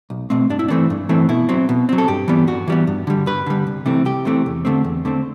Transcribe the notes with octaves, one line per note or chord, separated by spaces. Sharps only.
B1
B2 A3 C4
G2 D4
E4
E3 A3 C4 D4
G2
E3 A3 C4
B2 E4
F#3 C4
B2
F#3 C4
A4
G2 G4
E3 G3 B3
G2 F#4
E3 G3 B3
G2
D3 G3
G2 B4
D3 G3
C2
C3 E3 A3 C4
C2 G4
C3 E3 A3 C4
E2
D3 A3 C4
E2
D3 A3 C4